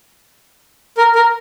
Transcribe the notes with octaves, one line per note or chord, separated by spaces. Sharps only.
A#4
A#4